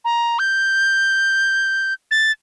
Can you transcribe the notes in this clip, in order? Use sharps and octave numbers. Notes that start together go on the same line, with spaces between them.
A#5
G6
A6